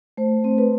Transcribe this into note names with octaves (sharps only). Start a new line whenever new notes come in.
A3 C5
C4
B4